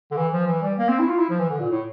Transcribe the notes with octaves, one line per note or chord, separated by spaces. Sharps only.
D3
E3
F3
E3
G3
A#3
C4
E4
F4
E4
F3
E3
D3
A#2
A2